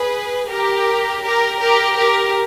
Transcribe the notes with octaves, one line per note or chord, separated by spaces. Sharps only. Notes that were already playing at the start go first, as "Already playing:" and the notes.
Already playing: G#4 B4
G4 A#4
G4 A#4
G4 A#4
G4 A#4